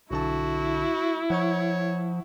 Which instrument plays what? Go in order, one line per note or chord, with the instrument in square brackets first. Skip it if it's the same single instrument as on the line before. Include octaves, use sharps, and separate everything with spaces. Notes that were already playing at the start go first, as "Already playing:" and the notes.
[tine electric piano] B1 D3 A5 [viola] E4 [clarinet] F#4
[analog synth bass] F3 [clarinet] C#5 [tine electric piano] F#5 C#6